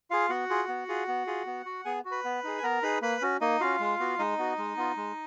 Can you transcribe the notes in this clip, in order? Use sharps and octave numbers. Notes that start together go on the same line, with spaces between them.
F4 G#4 F5
B3 F#4 F#5
F4 G#4
B3
F4 G#4
B3
F4 G#4
B3
F#4
B3 G#4 G#5
F#4
B4 B5
B3
D#4 G#4
G#5
B3 A#4 A#5
D#4 G#4 B4 B5
A#3 B4 B5
C#4 F#4
A#3 D#4 D#5
C#4 F4 F#4 F5
G#3
B3 F#4
G#3 D#4 D#5
B3 F#4
G#3
B3 F4
G#3